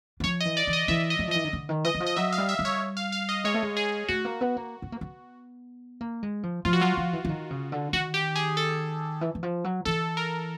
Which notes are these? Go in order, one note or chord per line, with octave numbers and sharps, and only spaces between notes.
F#3
F3 C#5
D#5
E3
D5
E3
D#5
E3 E5
D#5
F#3
F3
D#5
E3
D#3
D3
D#3
E3 D#5
E3
F3
D#5
F#3 E5
F5
G3
E5
G3
C#5
F5
F5
D#5
G#3 C#5
A3
G#3
G#4
A3 F#4
A#3
B3
A#3
B3
A#3
B3
A#3
G#3
F3
F3 F4
F#4
F#3 F4
F3
E3
E3
D#3
C#3
D3
D#3 F#4
G4
G#4
A4
E3
E3
F3
F#3
E3 A4
A#4